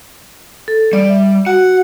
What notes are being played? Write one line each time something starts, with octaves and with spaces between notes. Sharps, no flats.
A4
G3 D5
E5
F#4 F#5